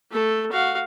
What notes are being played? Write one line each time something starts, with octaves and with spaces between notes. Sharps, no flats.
A3 A4
F#4 F5